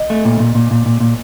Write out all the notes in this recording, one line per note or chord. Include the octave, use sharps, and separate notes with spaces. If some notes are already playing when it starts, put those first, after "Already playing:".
Already playing: D#5
A3
A#2
A#2
A#2
A#2
A#2
A#2